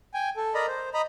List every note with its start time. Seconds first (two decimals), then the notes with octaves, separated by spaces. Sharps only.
0.14 G5 G#5
0.36 A4
0.54 A#4 D5 D#5 A#5 B5
0.68 C5
0.94 D#5 A#5 B5